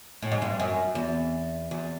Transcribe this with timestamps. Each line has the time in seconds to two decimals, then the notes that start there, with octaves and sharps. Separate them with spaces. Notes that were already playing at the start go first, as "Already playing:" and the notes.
0.22 A2
0.32 G#2
0.42 G2
0.60 F#2
0.95 E2
1.71 E2